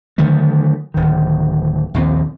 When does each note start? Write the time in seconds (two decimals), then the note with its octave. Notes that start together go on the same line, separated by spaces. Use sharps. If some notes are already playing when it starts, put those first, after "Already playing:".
0.18 D3 D#3 F#3 A3
0.94 D1 D#3
1.94 A#1 D#2 G#3 C4